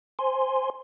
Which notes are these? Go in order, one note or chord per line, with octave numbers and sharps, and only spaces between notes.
C5 G#5 C6